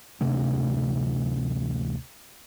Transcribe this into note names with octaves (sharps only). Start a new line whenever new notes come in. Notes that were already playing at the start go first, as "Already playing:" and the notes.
D1 C3 A3 D4